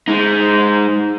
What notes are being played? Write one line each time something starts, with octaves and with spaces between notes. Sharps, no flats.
G#3 D#4